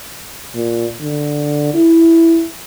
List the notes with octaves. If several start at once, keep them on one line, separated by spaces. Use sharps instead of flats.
A#2
D3
E4